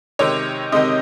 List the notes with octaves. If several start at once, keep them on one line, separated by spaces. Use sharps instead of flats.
C3 D#3 G#3 C4 C#5
C3 D#3 G#3 C4 D#5